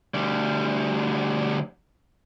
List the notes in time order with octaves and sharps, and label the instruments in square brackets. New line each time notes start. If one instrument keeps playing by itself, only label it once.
[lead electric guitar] D2 G3